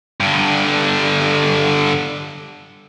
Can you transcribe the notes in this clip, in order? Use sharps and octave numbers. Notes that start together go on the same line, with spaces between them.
G2 D3